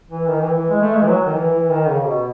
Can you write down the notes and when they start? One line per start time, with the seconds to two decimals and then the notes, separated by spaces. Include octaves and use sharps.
0.10 E3
0.27 D#3
0.41 E3
0.54 E3
0.70 G#3
0.81 A3
0.95 G#3
1.02 E3
1.08 F#3
1.26 D#3
1.34 E3
1.53 E3
1.70 D#3
1.89 C#3
2.06 B2